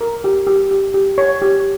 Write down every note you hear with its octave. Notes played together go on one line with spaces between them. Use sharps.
A#4
G4
G4
G4
G4
C#5
G4